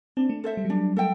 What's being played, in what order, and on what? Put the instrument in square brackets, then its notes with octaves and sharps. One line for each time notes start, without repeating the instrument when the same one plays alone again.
[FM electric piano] C4 [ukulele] D4
[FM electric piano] A3
[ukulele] A4 C5 E5
[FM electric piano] G3
F#3
[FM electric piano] G3 [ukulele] D4
[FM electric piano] A3 [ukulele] A4 E5 G5